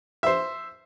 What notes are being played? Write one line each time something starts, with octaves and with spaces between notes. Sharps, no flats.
C5 E5